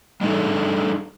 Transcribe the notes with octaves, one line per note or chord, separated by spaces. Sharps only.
G3 D4 D#4 G#4 A4